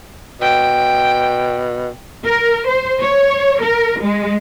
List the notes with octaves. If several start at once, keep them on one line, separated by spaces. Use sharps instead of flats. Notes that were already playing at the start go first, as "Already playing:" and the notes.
B2 G5
A#4
C5
C#5
A#4
G#3